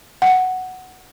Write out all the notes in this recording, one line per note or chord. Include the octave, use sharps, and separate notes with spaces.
F#5